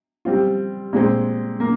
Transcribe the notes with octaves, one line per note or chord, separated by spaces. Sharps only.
G3 C4 F4
A#2 G#3 C4
A#3